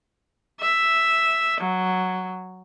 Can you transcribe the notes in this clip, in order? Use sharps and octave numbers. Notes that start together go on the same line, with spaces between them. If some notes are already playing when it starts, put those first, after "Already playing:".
E5
F#3